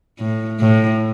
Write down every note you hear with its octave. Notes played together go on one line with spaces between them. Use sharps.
A2
A2